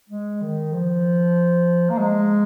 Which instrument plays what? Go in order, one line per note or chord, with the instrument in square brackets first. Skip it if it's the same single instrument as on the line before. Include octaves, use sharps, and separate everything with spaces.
[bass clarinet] G#3
D#3
F3
A#3
G#3